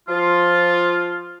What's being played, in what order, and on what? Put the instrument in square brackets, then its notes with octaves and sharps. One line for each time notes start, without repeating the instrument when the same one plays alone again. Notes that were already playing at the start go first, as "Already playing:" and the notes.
[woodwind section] F3 F4